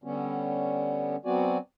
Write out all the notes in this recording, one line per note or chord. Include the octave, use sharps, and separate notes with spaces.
D3 G3 B3 C#4
F#3 B3 C4 F#4 D5 G#5